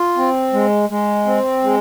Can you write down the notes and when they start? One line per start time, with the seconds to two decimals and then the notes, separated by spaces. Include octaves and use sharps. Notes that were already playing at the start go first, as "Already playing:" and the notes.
Already playing: F4
0.17 C4
0.53 G#3
0.89 G#3
1.26 C4
1.63 G#3